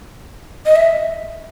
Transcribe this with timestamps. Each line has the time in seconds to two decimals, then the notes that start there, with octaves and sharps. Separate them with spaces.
0.66 D#5
0.76 E5